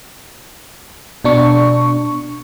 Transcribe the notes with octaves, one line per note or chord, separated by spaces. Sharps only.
B2 D4 C#6